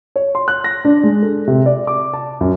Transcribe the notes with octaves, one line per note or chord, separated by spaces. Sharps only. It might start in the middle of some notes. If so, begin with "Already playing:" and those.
C#5
C6
F#6
A#6
D4
G#3
A4
C3
D5
D6
A5
F#2